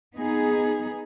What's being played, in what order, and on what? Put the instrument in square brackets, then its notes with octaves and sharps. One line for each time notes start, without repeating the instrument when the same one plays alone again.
[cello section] B3 D#4 G#4